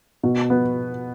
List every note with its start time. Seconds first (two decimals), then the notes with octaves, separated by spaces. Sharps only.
0.23 B2
0.50 B3